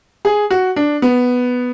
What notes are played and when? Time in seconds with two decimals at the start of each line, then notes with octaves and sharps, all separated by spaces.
0.25 G#4
0.50 F#4
0.76 D4
1.02 B3